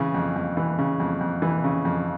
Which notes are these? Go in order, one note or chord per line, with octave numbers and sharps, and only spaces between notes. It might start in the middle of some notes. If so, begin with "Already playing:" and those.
Already playing: C#3 E3
F2
F2
E3
C#3
F2
F2
E3
C#3
F2